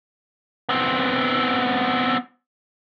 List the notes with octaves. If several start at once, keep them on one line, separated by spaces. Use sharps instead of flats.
B3 C4